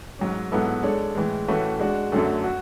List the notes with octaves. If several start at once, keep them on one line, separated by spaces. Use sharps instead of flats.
G#2 F#3 C#4
G#2 F#3 B3 E4 A4
G#3 D4 A4 C#5
A2 E3 G#3
A2 E3 A3 C#4 F#4
G#3 D4 F#4
F#2 D3 F#3 A3
F#4